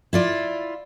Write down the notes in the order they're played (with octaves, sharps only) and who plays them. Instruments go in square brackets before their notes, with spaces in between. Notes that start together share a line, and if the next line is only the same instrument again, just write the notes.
[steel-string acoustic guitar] E4 F4 D5